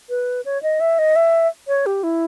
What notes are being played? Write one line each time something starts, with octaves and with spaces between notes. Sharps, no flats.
B4
C#5
D#5
E5
D#5
E5
C#5
G4
E4